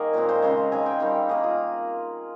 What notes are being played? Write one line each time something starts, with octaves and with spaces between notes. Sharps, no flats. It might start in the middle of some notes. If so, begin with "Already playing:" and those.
Already playing: D#3 A#3 G#4 A#4 D#5 F5
A#2 G#3 C4 C#5
C5
C#3 G#3 C4 C#5
F5
D#3 G#3 C4 G#5
G5
D#3 G3 C4 F5
D#3 A#3 G#4
F4